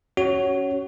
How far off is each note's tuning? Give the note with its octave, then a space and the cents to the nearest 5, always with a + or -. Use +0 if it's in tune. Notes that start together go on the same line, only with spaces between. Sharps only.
C#4 +5 F#4 +20 C#5 +0